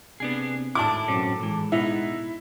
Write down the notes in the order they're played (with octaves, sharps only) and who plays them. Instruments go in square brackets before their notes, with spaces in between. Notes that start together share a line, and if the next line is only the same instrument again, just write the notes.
[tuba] C3 [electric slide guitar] B3 D4 G#4
[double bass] G#1 A2 [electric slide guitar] D4 E4 [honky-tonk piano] A5 D6
[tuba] F#2 [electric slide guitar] B2 C4 C#4
[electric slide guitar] E3 [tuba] G#3
[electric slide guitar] B2 B3 D#4 [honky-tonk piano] E4